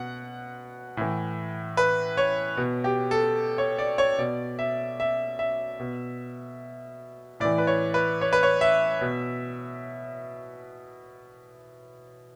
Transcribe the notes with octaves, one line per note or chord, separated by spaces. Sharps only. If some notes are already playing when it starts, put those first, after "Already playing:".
Already playing: B2 F#5
A2 E3
B4
C#5
B2
G4
A4
C#5
D5
C#5
B2 D5
E5
E5
E5
B2
A2 E3 D5
B4
C#5
B4
C#5
B4
C#5
E5
B2